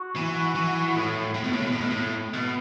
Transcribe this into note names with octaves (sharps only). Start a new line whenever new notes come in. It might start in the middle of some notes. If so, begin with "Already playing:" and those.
Already playing: F#4
E3
E3
A2
A2
B2
A2
B2
A2
B2
A2
B2